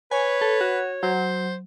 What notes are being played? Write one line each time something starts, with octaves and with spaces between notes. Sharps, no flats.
B4 C#5 G#5
A4
F#4
F#3 C5